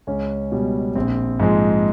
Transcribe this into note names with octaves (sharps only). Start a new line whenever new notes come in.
C#2 C#4
B2 G3
A#1 C4
G#2 F3 G#3